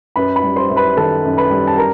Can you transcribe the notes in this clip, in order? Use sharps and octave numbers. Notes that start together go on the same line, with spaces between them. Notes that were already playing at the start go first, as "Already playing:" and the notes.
F#2 B4 B5
B4 B5
G3
C5 C6
F#2
B4 B5
D#3 A4 A5
F#2
B4 B5
G3
A5
A#4 A#5